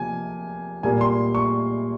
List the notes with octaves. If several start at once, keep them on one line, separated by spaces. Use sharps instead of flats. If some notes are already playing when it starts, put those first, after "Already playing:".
Already playing: C3 F3 A#3 G#5
A#2 G3 A#3 G#5
C6
C#6